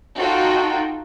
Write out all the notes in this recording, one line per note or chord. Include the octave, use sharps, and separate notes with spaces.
D#4 F4 F#4 A4 G5